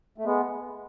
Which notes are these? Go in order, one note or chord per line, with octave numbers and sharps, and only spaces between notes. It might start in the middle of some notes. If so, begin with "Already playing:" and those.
A3
G#3 B3